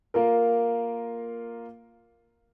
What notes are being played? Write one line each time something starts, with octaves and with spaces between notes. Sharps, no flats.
A#3 F4 A#4